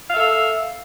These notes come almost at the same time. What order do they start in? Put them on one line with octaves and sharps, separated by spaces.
F5 E5 A4